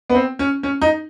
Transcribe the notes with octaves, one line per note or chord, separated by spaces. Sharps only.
B3
C4
C#4
C#4
D#4